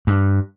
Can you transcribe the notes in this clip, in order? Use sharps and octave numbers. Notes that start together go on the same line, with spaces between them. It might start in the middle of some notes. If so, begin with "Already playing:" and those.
G2